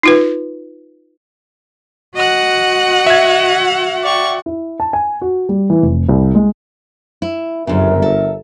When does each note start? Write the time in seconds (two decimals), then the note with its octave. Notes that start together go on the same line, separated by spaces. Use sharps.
0.03 D#4 F4 B4
2.16 F#4 D#5 F#5 F#6
3.07 E5 G#6
4.03 D5 G5 C#6
4.46 E4
4.80 A5
4.93 G#5
5.22 F#4
5.49 G3
5.70 E3
5.82 F1
6.09 C2
6.35 G#3
7.22 E4
7.67 G1 F#2 C#3 A#4 E5
8.02 A4